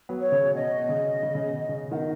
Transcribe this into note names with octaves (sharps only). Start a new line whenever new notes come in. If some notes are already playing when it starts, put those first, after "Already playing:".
F#3 B3
C#5
C#3
B2 D#5
B2
C#3
C#3
C#3
B2
C#3
B2 D#3 D#5 F#5